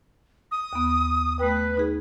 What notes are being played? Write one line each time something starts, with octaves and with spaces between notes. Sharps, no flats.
D#6
D#2 B3
A3 B4 G5
D#4 G#4